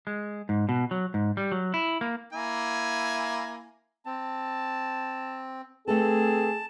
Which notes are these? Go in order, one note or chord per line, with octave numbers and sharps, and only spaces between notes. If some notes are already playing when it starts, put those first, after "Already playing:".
G#3
G#2
B2
F#3
G#2
G3
F#3
E4
A#3
A#3 E4 G#5
C4 A5
A3 C4 G#4 A4 B4 A5